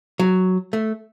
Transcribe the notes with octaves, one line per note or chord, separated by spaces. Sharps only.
F#3
A3